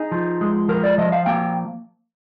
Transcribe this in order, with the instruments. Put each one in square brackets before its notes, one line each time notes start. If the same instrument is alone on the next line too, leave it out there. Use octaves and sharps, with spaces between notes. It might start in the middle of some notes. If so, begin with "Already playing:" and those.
Already playing: [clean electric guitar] D#4 G#4
F3
G#3
F3 A#4
D5
F3 D#5
F5
A#3 G5